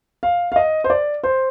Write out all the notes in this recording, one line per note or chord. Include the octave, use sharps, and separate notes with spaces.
F5
F5
D#5
C5
D5
C5